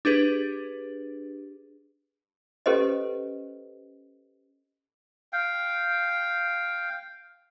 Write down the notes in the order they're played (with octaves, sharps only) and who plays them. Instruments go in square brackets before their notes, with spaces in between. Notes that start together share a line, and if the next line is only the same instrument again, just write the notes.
[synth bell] D4 G4 G#4 B4
[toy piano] C#4 G4 A4 B4 C5 D#5
[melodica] F5 G5